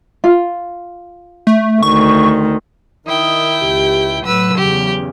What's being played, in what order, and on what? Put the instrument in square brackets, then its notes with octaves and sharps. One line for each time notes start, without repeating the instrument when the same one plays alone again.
[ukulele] F4
[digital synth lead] A3
[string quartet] D2 D#3 [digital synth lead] C#6
[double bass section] D#3 [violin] E4 G5 [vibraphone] D#6
[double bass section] C#2 [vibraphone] G4
[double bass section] A2 [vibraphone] F#3 [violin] B4 E6
[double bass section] E2 C#3 [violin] G4